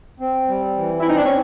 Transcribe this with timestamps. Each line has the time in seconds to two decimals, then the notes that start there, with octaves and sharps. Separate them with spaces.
0.20 C4
0.48 G3
0.77 E3
1.00 E4
1.06 C4 D#4
1.17 D4
1.26 C#4